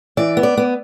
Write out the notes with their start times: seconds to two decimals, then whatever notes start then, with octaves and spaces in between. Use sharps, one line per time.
0.17 E3 D5
0.37 B3
0.43 D5
0.57 B3